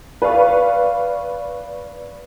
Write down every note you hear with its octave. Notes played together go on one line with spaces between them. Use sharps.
B4 D5 F5 C#6